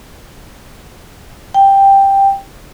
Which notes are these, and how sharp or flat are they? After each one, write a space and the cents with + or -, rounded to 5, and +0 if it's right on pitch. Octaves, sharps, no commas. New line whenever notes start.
G5 +5